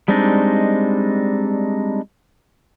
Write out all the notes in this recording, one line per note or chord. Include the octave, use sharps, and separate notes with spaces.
G3 G#3 C4 D4 D#4